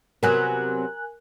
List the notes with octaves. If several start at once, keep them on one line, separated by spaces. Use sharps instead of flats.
C3 F#3 B3 A#4 G#5 F#6